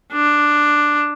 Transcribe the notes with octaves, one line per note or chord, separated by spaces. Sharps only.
D4